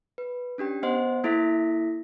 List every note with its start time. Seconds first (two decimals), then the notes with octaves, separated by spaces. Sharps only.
0.18 B4
0.58 C#4 D4 G4 G5
0.83 B3 C5 D#5 F#5 C6
1.24 A#3 E4 A4 E5 A#6 B6